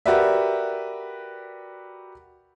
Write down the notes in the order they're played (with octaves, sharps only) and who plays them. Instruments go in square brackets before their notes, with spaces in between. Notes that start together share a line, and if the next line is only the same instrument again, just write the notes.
[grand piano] F#4 G4 A#4 B4 D5 E5